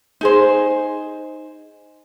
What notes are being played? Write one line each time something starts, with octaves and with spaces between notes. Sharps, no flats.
D#4 G#4 C5